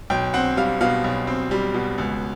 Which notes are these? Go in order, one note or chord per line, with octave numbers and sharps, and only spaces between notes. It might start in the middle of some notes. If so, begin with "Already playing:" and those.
B1 G5
C4 F#5
G3 F5
B2 F5
B1
C4
G3
B2
C#2